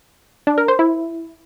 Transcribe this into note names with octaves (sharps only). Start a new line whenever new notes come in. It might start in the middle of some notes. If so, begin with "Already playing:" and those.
D4
A#4
C5
E4